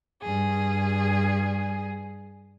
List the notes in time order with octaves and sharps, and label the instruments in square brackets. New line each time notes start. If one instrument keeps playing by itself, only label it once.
[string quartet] G2 G#4